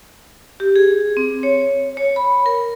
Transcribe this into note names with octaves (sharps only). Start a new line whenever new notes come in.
G4
G#4
C4
C#5
C#5
B5
A#4